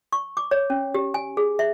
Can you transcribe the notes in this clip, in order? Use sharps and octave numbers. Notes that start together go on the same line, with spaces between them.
C#6
D6
C#5
C#4
G4
G#5
G#4
E5